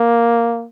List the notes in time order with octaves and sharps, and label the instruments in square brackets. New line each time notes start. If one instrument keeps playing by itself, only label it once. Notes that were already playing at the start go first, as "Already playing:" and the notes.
Already playing: [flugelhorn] A#3